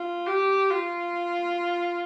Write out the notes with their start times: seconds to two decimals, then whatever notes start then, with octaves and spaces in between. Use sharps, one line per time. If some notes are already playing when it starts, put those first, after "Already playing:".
Already playing: F4
0.26 G4
0.70 F4